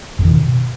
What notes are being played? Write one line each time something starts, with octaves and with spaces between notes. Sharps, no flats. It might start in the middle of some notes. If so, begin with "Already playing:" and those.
F#2
D#3
B2